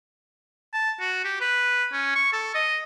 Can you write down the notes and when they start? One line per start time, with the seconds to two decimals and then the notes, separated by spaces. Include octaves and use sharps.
0.73 A5
1.00 F#4
1.24 G4
1.41 B4
1.92 C#4
2.15 C#6
2.33 A4
2.55 D#5